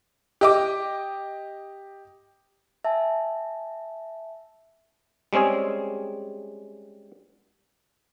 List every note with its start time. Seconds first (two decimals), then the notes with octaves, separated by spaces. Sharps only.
0.41 G4 D#5 D6
2.85 E5 G#5 A5
5.33 G3 G#3 C4 C#4 G#4